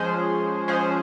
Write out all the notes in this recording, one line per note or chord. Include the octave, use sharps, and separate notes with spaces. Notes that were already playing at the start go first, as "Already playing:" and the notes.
Already playing: F3 G#3 C#4 G#4 C5
F3 G#3 C#4 G#4 C5